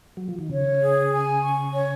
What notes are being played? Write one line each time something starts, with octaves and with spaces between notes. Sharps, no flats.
F#3
F3
D#3
C#3 C#5
G#4
G#5
C#6
C#5